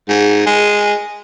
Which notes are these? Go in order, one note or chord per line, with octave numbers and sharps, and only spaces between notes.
G#2
G#3